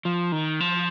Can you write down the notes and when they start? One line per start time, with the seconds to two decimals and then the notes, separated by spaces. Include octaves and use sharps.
0.05 F3
0.32 D#3
0.60 F3